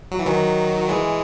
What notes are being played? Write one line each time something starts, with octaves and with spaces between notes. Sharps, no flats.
F#3
E3
D#3 F#3
E3 G#3